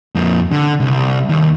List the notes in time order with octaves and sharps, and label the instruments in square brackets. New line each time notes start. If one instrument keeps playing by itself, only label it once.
[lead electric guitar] F2 A#3
D3
C2
D#2